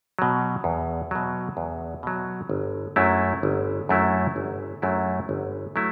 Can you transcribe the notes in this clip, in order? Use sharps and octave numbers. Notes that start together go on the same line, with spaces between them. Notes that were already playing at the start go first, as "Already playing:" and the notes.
B2 F#3
E2
B2 F#3
E2
B2 F#3
G1
F#2 F#3 A3 E4
G1
F#2 F#3 A3 E4
G1
F#2 F#3 A3 E4
G1
F#3 A3 E4